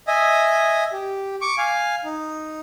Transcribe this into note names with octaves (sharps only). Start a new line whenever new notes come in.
D#5 E5 G#5
G4
C#6 D6
F5 G#5
D#4